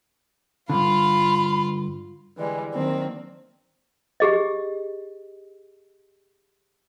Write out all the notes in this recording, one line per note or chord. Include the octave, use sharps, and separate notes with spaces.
G2 D3 F4 F5 B5
D3 E3 G3 G#3
D#3 F#3 A#3 C4 D4
G4 G#4 D#5